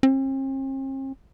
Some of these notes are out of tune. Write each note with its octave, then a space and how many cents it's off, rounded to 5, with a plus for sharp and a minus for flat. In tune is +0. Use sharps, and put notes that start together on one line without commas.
C4 +45